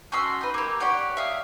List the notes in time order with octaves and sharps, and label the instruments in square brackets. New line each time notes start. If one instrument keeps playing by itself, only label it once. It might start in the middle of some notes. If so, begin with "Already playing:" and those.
[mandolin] C#4 F#4 C6 E6
D#4 B4
A#3 G4
G4 C#5 D5 F#5
E5 F5 D#6